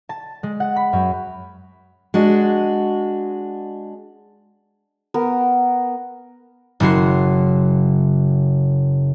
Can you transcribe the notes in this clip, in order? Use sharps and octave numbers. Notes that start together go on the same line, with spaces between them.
A5
G#3
F#5
B5
F#2
G#3 D4 F#4
B3 A#4
F#1 C#3 F#4 C6